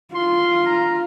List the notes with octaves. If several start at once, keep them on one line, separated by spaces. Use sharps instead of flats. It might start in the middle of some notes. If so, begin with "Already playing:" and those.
F4 C6
A#5